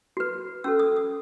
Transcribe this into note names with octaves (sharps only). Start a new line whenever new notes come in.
F#4 B4
C#4 F#4 A4 E6
D#6
D#6